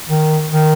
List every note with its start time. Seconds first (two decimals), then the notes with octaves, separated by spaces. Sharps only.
0.09 D#3
0.50 D#3